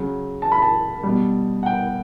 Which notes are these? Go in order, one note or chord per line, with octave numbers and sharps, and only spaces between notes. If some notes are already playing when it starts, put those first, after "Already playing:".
Already playing: C#3 F#3
A5
B5
A5
B2 G3
F#5
G5